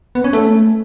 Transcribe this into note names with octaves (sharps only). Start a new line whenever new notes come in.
B3
C#4
A3